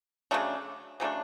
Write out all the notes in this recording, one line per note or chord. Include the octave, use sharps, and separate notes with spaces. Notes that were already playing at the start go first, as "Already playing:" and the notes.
C#3 F#3 A3 D4
C#3 F#3 A3 D4